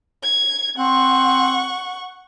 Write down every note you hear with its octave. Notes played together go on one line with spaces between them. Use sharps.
G#6
C4 F#5 C#6